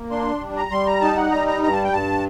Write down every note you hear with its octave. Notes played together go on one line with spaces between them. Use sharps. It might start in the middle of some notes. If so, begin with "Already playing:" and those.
Already playing: A#3
D4 C6
G3
A#5
G3 C6
A#5
D#4 A5
F#5
G3 A#5
A#5
G2 A#5
A5
G5
G2 A5